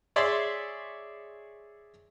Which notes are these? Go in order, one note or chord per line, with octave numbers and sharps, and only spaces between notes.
G#4 C#5 D5 E5 C6 E6